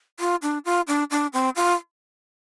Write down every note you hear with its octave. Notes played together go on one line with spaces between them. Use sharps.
F4
D4
F4
D4
D4
C4
F4